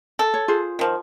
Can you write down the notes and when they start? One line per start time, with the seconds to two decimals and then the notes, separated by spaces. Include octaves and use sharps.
0.19 A4
0.34 C#5
0.48 F4 G#4 C5
0.79 D#3 F3